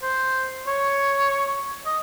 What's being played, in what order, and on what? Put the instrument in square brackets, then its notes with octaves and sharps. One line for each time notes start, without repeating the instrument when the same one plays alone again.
[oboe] C5
C#5
D#5